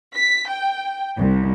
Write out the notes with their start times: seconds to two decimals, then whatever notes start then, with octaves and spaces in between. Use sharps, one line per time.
0.14 B6
0.49 G5
1.17 C2